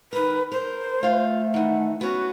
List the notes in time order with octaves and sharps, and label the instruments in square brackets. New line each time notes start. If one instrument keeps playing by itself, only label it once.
[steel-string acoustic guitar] D#3 A#4 [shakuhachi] B4
[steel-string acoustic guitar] A#4 [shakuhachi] C5
[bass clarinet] A3 [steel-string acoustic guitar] F4 F5
[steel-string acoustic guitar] D#3 E3 [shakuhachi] F#5
[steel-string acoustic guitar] B3 C#4 [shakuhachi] F#4